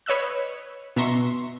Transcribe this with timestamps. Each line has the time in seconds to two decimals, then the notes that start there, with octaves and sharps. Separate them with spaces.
0.06 B4 C#5 D#5 E6 F#6
0.96 B2 E5 A#5 C6 C#6